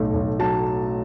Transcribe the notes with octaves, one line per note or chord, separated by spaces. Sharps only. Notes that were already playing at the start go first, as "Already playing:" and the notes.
Already playing: B1 A2 A3
B1
F#3 A5